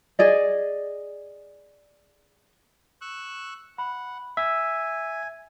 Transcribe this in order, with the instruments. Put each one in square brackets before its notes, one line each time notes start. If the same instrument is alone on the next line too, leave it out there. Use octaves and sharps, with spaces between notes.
[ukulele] G#4 D5 D#5
[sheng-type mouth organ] C#6 E6 F#6
[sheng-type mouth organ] F#5 [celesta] B5
[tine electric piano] E5 [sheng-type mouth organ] G#5 [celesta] E6